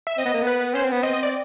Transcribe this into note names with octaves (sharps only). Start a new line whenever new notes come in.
E5
C4 D#5
B3
A#3
B3
B4
C#4 C5
C4
B3
C4 D#5
D#5
D5